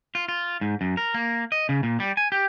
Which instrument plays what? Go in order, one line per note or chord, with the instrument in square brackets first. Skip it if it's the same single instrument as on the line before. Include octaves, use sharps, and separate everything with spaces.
[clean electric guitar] F4
F4
G#2
F#2
A#4
A#3
D#5
C#3
A#2
G3
G#5
G4